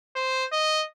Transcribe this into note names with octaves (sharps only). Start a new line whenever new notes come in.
C5
D#5